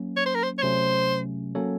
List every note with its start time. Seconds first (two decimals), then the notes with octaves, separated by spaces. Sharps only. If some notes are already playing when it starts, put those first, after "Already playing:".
Already playing: F#3 A#3 C#4
0.16 C#5
0.26 C5
0.35 A#4
0.43 C5
0.58 C#5
0.62 C3 F#3 A3 C#4 C5
1.55 F#3 A#3 C#4 A4 C#5